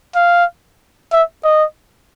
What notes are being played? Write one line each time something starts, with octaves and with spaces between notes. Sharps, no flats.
F5
E5
D#5